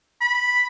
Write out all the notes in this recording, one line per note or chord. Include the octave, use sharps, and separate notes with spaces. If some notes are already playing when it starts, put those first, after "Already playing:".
B5